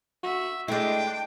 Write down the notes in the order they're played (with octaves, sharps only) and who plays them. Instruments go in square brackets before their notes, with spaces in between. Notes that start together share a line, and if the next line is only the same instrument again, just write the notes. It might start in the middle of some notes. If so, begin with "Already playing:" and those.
[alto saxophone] F#4 [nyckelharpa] E5
[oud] G#3 E4 [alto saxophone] A3 [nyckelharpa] D4 C5 [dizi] G5